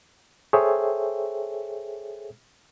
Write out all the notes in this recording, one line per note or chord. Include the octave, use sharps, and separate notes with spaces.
G#4 A4 C5 C#5 E5 G5